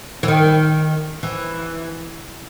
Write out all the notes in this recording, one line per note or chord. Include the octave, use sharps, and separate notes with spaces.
E3
D#3
E3